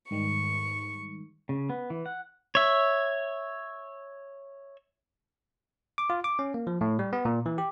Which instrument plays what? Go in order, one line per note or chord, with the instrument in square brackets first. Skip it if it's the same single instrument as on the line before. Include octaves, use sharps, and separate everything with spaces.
[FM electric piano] G#2 D#3 G3 [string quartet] C#6
[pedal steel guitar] C#3
B3
E3
F#5
C#5 E5
[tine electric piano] D6
F4
D6
C#4
A#3
F3
A2
G3
B3
A#2
E3
G4